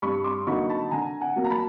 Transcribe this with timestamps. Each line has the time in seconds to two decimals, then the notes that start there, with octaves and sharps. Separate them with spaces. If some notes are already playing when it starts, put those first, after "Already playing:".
0.02 G2 B5 C#6
0.24 C6 D6
0.47 D3 F#3 A#3 D#4 B5 C#6
0.69 A5 B5
0.91 D3 G#5 A#5
1.21 F#5 G#5
1.36 F#3 A#3
1.44 A#5
1.50 A5 B5